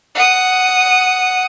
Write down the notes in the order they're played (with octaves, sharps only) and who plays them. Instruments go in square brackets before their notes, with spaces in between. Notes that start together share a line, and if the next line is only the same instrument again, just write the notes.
[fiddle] F#5 D#6